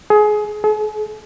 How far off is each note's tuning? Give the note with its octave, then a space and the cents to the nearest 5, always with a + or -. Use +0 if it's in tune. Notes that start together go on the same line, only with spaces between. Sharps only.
G#4 +25
G#4 +45